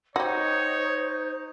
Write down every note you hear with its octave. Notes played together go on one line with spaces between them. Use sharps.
D#4 F#4 G4 C5 C#5